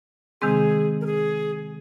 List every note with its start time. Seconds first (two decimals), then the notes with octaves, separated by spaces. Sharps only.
0.41 C3 D#3 G#3 C4 G#4
1.01 A#4
1.06 G#4